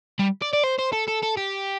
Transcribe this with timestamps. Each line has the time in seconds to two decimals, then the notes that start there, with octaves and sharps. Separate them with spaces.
0.19 G3
0.42 D5
0.53 D5
0.64 C5
0.79 C5
0.92 A4
1.08 A4
1.22 A4
1.37 G4